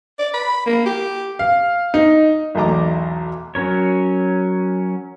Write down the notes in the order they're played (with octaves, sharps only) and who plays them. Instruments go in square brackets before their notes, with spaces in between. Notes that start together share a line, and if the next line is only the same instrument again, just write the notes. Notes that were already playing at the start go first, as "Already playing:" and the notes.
[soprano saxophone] D5
B5
A#3
G4
[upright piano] F5
D#4
[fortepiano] B1 E2 A3 D#5 A#5 D6
[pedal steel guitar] F#3 C#4 A#4 C#5